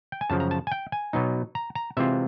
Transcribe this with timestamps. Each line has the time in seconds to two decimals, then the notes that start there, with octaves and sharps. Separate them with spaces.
0.12 G5
0.21 G#5
0.30 F#2 C#3 F3 A5
0.40 A#5
0.51 A5
0.67 G#5
0.72 G5
0.92 G#5
1.13 B2 F#3 B3 D#4
1.55 A#5
1.75 A#5
1.97 C3 E3 G#3 C4 F4 E5